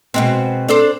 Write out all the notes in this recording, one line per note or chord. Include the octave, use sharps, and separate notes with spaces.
B2 G#3 C4
D4 A4 C5